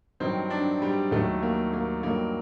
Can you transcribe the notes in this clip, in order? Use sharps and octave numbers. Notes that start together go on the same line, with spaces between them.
G2 D#3 F#3 C4
D4
G3
D#2 D#3 F#3 A3
A#3
A#3
G2 D#3 F#3 A#3